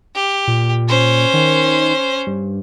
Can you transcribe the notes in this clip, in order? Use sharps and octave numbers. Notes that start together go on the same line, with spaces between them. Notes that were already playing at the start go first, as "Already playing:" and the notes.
G4
A#2
C#4 C5
D#3
G2